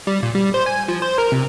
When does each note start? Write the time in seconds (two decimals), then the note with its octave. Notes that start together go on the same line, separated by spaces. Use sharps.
0.07 G3
0.23 A#2
0.35 G3
0.54 C5
0.66 G#5
0.88 F3
1.02 C5
1.18 A#4
1.32 C3